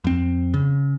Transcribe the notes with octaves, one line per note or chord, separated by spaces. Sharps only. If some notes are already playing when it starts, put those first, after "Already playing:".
F2 C4
C#3